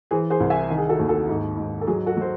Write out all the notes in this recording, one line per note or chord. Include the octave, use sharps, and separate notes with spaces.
E3 G#4 C5
G#4 C5
C2
E5 G#5
D#3
G#4
F#4 A4
D#2
F#4 A4
G#2
G#2
A4
F#3 G#4
F#4 A4
F#3 C5